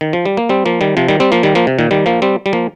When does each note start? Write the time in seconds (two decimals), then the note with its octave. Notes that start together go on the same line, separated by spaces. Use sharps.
0.01 D#3
0.13 F3
0.26 G3
0.37 A#3
0.49 G3 C4
0.65 F3 A#3
0.81 D#3 G3
0.97 C3 F3
1.08 D#3 G3
1.20 G3 C4
1.32 F3 A#3
1.43 D#3 G3
1.55 F3 A#3
1.67 C3
1.79 A#2 D#3
1.91 D#3 G3
2.06 F3 A#3
2.22 G3 C4
2.46 G3
2.53 F3 A#3